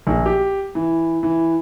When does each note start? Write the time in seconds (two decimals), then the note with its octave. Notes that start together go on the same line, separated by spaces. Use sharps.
0.07 A#1
0.26 G4
0.75 E3
1.23 E3